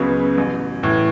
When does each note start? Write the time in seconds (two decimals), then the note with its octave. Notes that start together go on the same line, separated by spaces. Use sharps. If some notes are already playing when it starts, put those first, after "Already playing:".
Already playing: C#2 C#3 F#3 B3
0.38 A1
0.83 A2 E3